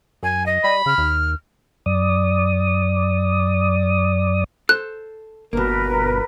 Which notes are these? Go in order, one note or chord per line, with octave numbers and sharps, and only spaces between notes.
F#2 G#5
D#5
G3 B5
C#3 F6
D#2
F#2 D5 D#6
A4 C5 F#6
G1 B2 A#3 A#4 B4